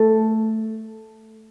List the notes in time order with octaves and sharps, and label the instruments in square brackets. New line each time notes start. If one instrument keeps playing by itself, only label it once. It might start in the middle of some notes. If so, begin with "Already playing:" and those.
Already playing: [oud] A3